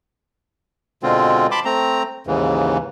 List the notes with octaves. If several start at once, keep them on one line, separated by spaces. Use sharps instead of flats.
B2 D3 G#3 C4 F4
A5 B5 C6 D6
A3 C4 A#5
D#2 G#2 C#3 E3